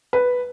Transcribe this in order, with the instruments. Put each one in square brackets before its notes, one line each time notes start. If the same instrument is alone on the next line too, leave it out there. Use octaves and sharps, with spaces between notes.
[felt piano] B4